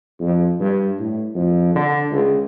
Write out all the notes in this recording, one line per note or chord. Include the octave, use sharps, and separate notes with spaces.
F2
G2
A2
F2
D3
C#2